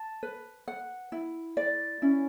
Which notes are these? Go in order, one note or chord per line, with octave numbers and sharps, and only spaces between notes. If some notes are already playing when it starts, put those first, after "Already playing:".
Already playing: A5
B4
F#5
E4
D5
C#4 E4